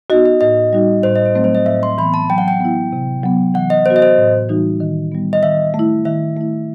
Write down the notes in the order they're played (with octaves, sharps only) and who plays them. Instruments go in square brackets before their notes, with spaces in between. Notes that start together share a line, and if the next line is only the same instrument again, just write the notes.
[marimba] B3 D#4 F#4 [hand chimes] D#5
[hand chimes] D#5
[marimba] A2 [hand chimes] D#5
[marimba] G3 D#4 F#4
[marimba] A2 [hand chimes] C5
[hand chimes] D#5
C5
[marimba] F#3 A3 C4
[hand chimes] C5
D#5
[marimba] A2 [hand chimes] E5
[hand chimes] C6
[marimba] E3 B3 [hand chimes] B5
[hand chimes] A5
[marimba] F#3 [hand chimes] G5
[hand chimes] F#5
G5
[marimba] B3 E4
C3
F#3 B3
[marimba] E3 [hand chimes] F#5
[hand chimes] D#5
[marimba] B3 F#4 [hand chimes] C5
[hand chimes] D#5
C5
[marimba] A2
E3 G3 D#4 F#4
D#3
G3 B3
[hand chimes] D#5
[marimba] D#3 [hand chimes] E5
[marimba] A3
E4
[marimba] D#3 [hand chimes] E5
[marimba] A3 E4